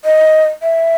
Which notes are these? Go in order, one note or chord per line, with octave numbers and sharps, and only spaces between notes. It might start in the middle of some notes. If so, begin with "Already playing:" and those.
D#5
E5